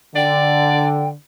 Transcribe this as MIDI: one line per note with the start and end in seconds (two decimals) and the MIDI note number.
0.16 1.13 50
0.16 0.87 74
0.16 1.08 79